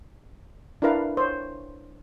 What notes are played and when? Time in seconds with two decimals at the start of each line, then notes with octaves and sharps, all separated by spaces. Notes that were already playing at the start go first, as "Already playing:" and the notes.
0.82 D4 E4 A#4 B4 F5
1.17 C5 C#5